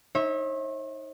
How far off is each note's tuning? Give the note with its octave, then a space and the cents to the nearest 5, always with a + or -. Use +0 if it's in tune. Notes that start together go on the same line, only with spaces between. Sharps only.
D#4 +15 C#5 -45 E5 -15